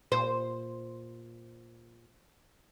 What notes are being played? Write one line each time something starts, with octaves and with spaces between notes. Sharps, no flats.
A#2 C5